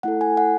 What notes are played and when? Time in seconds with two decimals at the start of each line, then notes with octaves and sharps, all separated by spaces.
0.03 A3 E4 A4 F#5
0.21 G#5
0.37 F#5